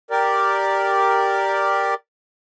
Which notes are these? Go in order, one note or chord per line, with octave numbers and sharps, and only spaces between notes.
G4 A#4 D5